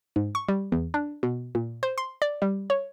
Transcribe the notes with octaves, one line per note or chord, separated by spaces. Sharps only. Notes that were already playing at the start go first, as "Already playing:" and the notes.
G#2
C#6
G3
E2
D4
B2
A#2
C5
C6
D5
G3
C#5